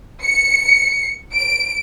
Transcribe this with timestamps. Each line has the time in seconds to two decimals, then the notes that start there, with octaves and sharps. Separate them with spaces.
0.24 C#7
1.33 D7